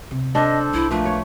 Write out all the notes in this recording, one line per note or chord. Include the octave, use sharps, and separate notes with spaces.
C3
D4 A4 C5 D#5
B1 B3 E4
F3 A3 A#3 B4
C#5